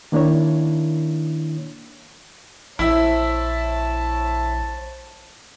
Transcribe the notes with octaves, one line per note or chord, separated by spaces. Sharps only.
D#3 A#3 D4 E4 C#5
A#1 E4 C5 C#5 E5 A5